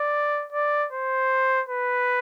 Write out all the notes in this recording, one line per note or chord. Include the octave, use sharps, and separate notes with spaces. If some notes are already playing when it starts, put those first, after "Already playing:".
Already playing: D5
D5
C5
B4